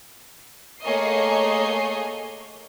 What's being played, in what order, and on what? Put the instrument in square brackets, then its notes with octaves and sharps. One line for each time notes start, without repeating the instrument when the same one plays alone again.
[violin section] A3 A#3 G#4 C#5 D#5 C7